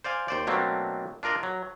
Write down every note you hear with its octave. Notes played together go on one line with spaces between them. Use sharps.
C5 D5 F5 G#5
D#2 C5 D5
B2 F#3 A3 A#3 C4 D4
D4 F4 A#4 D5 D#5
F#3